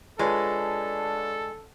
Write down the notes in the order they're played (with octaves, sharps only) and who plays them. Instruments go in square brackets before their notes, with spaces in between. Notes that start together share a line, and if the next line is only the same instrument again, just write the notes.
[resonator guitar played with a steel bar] G#3 [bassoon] D4 [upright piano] F4 B4 C#5 [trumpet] A4